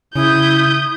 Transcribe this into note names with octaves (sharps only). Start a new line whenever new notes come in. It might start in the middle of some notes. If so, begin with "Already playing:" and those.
C#3 E4 D#6 G6